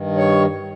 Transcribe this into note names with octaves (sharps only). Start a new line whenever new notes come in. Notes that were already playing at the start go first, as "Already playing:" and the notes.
Already playing: G2 D#3
C#5